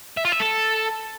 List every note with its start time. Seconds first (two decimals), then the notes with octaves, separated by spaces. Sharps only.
0.17 E5
0.25 F4
0.32 E5
0.40 A4